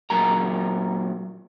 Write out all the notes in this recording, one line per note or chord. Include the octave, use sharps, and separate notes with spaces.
A#2 F#3 D#4 A#4 A#5